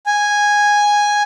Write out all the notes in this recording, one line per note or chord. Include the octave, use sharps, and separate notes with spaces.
G#5